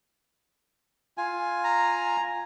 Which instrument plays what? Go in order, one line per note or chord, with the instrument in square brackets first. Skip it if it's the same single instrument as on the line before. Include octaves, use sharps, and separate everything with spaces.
[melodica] F4 G#5
[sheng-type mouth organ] A#5